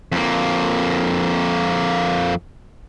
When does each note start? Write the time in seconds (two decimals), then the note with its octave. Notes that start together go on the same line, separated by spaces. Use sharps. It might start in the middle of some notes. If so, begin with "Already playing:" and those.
0.12 F2 A#3